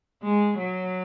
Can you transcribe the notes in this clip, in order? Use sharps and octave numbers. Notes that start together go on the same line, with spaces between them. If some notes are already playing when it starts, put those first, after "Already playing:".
G#3
F#3